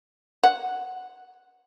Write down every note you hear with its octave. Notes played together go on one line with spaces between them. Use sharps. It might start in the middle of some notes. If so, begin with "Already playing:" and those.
F#5